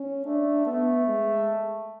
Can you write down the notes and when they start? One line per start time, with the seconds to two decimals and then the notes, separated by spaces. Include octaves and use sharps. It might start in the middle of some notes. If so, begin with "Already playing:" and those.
Already playing: C#4
0.26 A3 D4
0.66 A3 B3
1.07 G#3